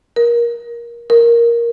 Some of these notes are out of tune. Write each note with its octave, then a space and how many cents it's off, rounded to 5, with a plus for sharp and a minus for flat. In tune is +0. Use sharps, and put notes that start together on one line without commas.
A#4 +20
A#4 +5